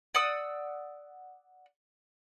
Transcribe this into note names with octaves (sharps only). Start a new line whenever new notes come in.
D5 F#5 D#6 E6